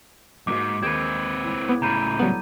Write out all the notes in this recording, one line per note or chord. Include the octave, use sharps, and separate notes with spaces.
E2 G#2 G#3 A#3 F#4 D6
D#2 C4 G#4 B4 G#6 C7
C#2 E4
B3
A2 C#3 G#5 A#5 B5 G6 D#7
F#3 G3 B3 A4